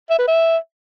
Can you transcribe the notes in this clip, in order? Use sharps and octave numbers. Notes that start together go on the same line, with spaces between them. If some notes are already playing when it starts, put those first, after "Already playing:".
E5
B4
E5